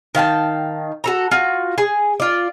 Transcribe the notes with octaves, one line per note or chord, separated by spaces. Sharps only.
D#3 F5 G5 A5
F#4 A4 A#5
F4 F#4
G#4
F4 D5